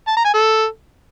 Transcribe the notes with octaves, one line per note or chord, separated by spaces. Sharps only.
A5
A#5
G#5
A4